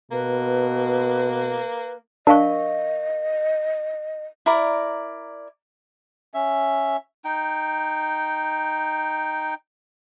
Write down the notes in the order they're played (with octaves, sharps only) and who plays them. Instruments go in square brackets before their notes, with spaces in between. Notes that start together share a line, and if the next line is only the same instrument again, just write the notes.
[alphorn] B2 [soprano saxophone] A#3 [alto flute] B4
[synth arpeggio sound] D4 [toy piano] A#4 F5 C#6 [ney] D#5
[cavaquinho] E4 A#4 D5 A#5
[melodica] C#4 E5
D#4 G5